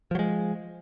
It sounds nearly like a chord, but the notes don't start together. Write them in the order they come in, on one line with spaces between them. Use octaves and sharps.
F3 F#3 G#3